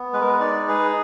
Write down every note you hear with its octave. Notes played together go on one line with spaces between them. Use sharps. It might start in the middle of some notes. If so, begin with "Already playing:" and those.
Already playing: B3
G#3 B4
A#4
B4
D#4 D5
G#4 B4